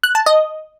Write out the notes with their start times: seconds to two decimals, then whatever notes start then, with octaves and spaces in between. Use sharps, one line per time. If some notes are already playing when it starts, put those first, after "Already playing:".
0.03 F#6
0.15 A5
0.26 D#5